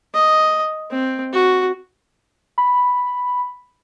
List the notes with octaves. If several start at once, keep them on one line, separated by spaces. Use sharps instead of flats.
D#5
C4
F#4
B5